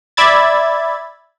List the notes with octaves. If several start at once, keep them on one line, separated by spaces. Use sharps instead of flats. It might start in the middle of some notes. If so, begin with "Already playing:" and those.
D5 E5 B5 G#6 A6